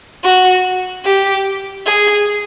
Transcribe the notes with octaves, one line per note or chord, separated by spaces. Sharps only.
F#4
G4
G#4